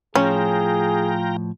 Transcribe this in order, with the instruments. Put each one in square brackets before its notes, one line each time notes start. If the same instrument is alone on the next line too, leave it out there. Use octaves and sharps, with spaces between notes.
[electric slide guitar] A2 F3 [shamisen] C#4 [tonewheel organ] F4 G5 A#5 [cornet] G#4